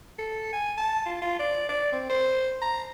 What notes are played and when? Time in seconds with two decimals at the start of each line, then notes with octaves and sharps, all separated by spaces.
0.19 A4
0.53 G#5
0.78 A5
1.06 F4
1.22 F4
1.39 D5
1.69 D5
1.93 C4
2.10 C5
2.62 A#5